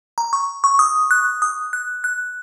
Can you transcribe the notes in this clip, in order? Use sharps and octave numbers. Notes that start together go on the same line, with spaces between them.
A#5
C#6
C#6
D#6
F#6
D#6
F#6
F#6